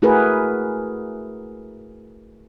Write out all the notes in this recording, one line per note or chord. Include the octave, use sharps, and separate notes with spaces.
A3 E4 F#4 G#4 A#4 B4